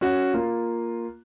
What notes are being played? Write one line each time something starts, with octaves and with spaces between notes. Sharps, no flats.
C#4 F#4
A#3 F4